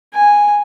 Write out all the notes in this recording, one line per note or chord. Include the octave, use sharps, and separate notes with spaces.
G#5